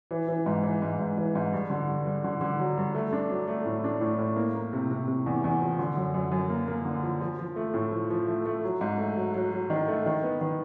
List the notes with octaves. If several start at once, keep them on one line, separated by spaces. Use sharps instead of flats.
E3
E3
G#2
E3
G#2
G#2
E3
G#2
G2
D3
G2
G2
D3
D3
F#3
G2
A3
D4
F#3
A3
A2
D4
A2
A2
A#3
A#3
C3
C3
C3
E2
E2
F3
D3
F#2
F#2
F#2
A#3
A#3
D3
F3
F3
F3
A3
A2
F3
F3
A3
A3
F#3
G#2
A3
F#3
F#3
F#3
D#3
A3
D#3
B3
D#3